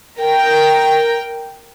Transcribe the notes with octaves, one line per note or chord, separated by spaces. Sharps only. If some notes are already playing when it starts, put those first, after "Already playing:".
A#4 G5